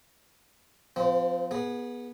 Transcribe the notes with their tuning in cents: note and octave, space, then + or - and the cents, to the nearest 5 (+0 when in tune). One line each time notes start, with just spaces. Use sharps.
F3 +0 C4 -35
B3 -20 G#4 +0